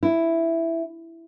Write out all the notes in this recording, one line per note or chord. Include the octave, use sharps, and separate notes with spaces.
E4